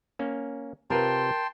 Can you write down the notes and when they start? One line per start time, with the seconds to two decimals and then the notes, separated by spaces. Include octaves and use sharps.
0.19 A#3 C#4
0.90 C3 F4 A#4 B4 G5 A5 C6